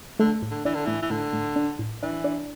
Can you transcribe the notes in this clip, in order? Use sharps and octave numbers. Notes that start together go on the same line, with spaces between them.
D3 A3
A2
D3
E3 D4
D3
A2 E3
E3
A2 D3
A2
D4
A2
E3 D4
D4